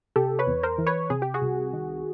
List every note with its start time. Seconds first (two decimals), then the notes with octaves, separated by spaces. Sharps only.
0.16 C3 G4 A4
0.39 B4 C#5
0.47 E2
0.63 A#4 C5
0.78 E3
0.87 B4 C#5
1.10 C3 G#4
1.22 G4
1.34 F#4 G#4
1.42 C2
1.73 D#3